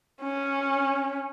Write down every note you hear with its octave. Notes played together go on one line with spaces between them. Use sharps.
C#4